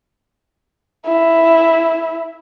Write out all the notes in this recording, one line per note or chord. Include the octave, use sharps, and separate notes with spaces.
E4